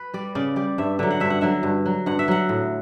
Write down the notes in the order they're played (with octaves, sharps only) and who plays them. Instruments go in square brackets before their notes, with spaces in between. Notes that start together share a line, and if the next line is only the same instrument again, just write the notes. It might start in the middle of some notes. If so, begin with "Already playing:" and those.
Already playing: [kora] B4
G3 D5
C#3 D5
G3 D5
G2 E5
D3 F#3 E5
F#5
G2 E5
F#5
D3 F#3 E5
G2
F#3
G2 F#5
E5
F#3 F#5
A2